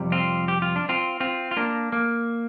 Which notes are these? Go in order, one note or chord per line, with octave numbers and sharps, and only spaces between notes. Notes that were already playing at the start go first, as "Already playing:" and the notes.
Already playing: F2 C3 G3
C4 F4
G4
F4
D4
C4 F4
C4 F4
F4
A#3 D4
A#3